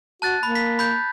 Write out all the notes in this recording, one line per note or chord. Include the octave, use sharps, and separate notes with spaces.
F#4 A5 F#6 A6
A#3 B5
B6
B5 G6